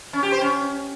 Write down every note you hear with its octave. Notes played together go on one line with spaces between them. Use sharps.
C#4
G4
C5
C#4